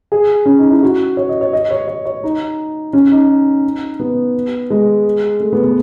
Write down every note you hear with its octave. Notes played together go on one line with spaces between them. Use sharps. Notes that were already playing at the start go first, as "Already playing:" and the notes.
G#4
C#4
D#4
E4
F#4
C#5
D#5
C#5
D#5
C#5
C#5
C#5
D#4
C#4
D#4
B3
G#3
A3
B3
B3